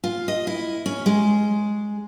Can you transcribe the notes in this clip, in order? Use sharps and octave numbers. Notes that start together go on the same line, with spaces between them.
F4
D#5
E4
C#4
G#3